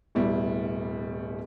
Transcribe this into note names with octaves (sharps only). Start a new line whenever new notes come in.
D1 B2 G3 E4